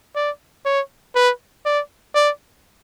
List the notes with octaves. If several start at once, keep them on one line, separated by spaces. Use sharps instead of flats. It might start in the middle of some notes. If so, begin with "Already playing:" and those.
D5
C#5
B4
D5
D5